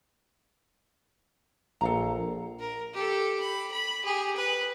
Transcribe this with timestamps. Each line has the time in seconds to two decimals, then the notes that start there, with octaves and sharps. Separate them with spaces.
1.81 A#1 A4 F5 A#5
2.60 A#4
2.94 G4 A4
3.40 B5
3.71 B5
4.04 G4 G#4
4.36 B4